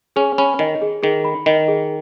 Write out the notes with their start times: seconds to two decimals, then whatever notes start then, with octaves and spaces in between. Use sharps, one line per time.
0.16 C#4 G#4
0.38 C#4 B5
0.59 D#3 D#5
0.82 G#4
1.03 D#3 G#4
1.24 B5
1.46 D#3 D#5
1.68 G#4